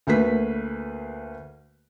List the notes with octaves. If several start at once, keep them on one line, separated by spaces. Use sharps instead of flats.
D2 A3 A#3 B4 B6